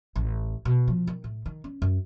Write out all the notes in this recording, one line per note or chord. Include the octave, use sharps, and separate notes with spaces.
A1
B2
F3
D#3
A2
D#3
C#4
F#2